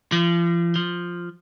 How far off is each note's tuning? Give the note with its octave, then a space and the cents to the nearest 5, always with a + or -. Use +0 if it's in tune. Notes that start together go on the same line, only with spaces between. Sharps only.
F3 -40
F3 +0